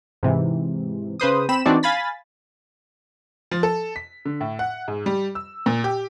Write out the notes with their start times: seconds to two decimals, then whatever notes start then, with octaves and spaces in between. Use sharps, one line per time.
0.23 G#2 C3 E3
1.20 C#3 B4 C5 D#6
1.49 C4 B5 E7
1.66 E3 C4 D4 D#4 F#4 D5
1.83 F5 G#5 B5 A6 B6
3.51 F3
3.63 A4
3.96 B6
4.25 D3
4.41 A2
4.59 F#5
4.88 G#2
5.06 G3
5.35 E6
5.66 A#2
5.84 G4